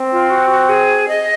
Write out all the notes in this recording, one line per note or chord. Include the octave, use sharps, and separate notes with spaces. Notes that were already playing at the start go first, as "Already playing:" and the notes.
Already playing: C4
F4
F#4
F#4
G#4
D#5